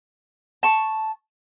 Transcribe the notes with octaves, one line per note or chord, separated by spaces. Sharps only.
A5 C#6